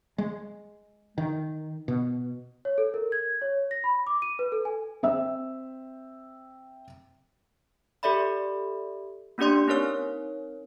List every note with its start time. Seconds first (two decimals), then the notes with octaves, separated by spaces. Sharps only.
0.18 G#3
1.18 D#3
1.88 B2
2.65 C#5
2.78 A4
2.94 A#4
3.12 G#6
3.42 C#5
3.71 A#6
3.84 B5
4.07 D6
4.22 D#7
4.39 B4
4.52 A4
4.65 G#5
5.03 C4 E5 E6
8.03 G4 A4 D5 E5 B5
9.38 A#3 C#4 D4 G4 D5 C6
9.68 C4 D#4 A#4 C#5 F6